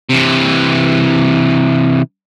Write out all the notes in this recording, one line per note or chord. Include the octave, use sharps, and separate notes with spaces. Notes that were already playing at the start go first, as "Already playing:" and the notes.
C3 E3